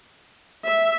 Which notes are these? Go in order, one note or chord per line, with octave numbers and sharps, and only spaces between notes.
E5